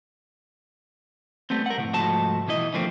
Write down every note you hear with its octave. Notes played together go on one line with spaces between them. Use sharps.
G3 A3 B3 C4
A#4 F#5
F2 A2 C3
C2 G#2 F3 A3 F#4 A5
B2 E3 E4 D#5
D3 E3 F3 A3 A#3 C4